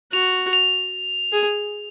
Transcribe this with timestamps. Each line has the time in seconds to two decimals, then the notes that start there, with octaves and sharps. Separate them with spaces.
0.13 F#4 F7
0.53 F7
1.33 G#4